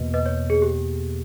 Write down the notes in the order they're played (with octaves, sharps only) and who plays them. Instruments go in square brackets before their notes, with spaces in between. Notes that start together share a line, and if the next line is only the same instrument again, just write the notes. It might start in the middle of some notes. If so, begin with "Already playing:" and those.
Already playing: [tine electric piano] E2 B2 A#3 [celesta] B4 D#5
[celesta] B4 D#5
C#5
G#4
G4